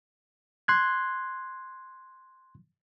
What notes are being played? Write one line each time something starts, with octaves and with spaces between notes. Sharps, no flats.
C6 F#6 G#6